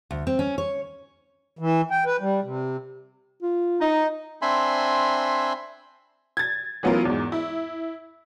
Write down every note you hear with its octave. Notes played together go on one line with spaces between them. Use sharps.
D2
C4
C#4
C#5
E3
G5
B4
G3
C3
F4
D#4
C4 D4 E5 G#5 B5 C6
G#6 A6
E3 F#3 B3 C#4 F4 A#4
E2 G#2
E4